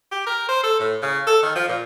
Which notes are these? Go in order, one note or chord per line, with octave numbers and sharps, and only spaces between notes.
G4
A#4
C5
A4
A2
C#3
A4
D#3
F3
A#2